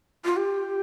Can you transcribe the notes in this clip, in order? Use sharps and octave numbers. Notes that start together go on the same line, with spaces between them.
F4
G4